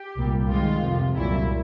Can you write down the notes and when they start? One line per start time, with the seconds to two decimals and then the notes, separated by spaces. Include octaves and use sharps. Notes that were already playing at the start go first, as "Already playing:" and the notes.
Already playing: G4
0.16 C2 A#2 G3
0.48 G#2 D#3 G#3 F4
0.82 F2 C3 F3
1.16 C2 A#2 F#3 E4